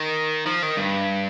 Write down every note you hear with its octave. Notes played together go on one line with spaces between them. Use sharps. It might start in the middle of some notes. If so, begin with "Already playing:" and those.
Already playing: D#3
F3
D#3
G2